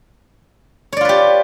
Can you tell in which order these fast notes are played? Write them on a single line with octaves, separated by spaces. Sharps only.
C#5 D5 F4 B4 G4